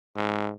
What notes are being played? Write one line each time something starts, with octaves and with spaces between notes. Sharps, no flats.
G#2